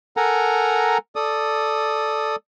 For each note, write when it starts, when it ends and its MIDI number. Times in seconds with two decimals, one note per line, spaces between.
0.17 0.98 69
0.17 0.98 70
0.17 0.98 78
0.17 0.98 80
0.17 0.98 82
1.16 2.36 69
1.16 2.36 74
1.16 2.36 87